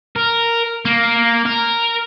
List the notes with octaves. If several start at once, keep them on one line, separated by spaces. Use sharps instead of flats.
A#4
A#3
A#4